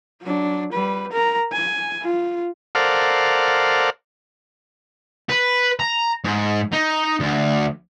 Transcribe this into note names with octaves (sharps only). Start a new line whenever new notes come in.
F#3 D4
G3 B4
A#4 A#5
G#5
F4
A4 A#4 C5 D5 F5 F#5
B4
A#5
G#2
D#4
D2